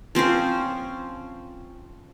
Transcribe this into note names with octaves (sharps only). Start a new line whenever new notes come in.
F3 C4 C#4 C5